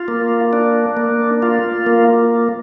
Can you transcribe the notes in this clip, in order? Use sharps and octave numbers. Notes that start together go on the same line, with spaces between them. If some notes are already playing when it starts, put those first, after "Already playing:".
Already playing: F4
A#3
D4
A#3
F4
A#3